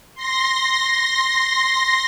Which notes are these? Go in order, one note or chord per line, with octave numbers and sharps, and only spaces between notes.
C6 A#6